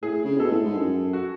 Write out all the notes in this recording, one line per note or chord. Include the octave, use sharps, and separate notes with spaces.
A2 G#4
C#3
B2 A4
A2
G#2
F#2
F#4